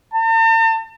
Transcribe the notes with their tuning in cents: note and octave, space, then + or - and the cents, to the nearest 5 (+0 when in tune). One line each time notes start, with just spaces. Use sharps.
A5 +45